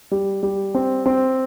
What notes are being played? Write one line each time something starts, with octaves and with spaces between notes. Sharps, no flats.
G3
G3
C4
C4